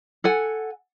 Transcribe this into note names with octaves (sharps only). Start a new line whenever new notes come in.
A4 F#5 G#5